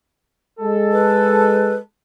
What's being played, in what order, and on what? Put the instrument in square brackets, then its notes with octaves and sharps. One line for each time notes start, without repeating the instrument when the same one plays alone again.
[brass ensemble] G#3 A4
[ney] B4